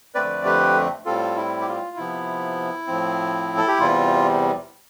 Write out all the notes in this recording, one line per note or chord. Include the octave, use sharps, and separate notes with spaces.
F2 D3 A3 C4 B4 D5
G4 B4
A2 G3 C4 F4 A4
E4
G4
F4
C3 F3 B3 E4
A2 F3 C4
A4
G4
E2 C3 G3 F4